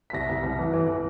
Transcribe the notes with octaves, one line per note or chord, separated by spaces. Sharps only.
B6
C2 A#6
C2
C2
E3
E3
E3